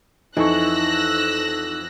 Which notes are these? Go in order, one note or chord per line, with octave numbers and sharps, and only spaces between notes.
F2 E3 D#4 C#6 E6 F#6 A#6